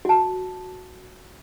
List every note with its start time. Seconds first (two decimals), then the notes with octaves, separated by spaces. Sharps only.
0.05 F#4 A5